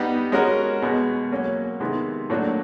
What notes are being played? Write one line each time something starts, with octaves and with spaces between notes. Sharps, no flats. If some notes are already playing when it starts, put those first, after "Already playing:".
Already playing: G3 B3 D#4 G4
G#3 C#4 F#4 A#4
B2 G#3 B3
F#3 A#3 C#4
C3 D#3 G#3 B3
A2 F#3 A#3 D4 F#4